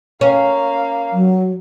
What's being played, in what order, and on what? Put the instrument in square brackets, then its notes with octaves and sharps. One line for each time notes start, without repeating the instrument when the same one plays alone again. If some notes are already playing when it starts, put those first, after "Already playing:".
[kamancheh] A#3 F5 [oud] C#4
[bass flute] F#3